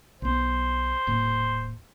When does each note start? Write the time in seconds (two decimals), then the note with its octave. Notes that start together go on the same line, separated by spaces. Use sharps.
0.22 B1 B3 C5
1.07 D#1 A2 A#3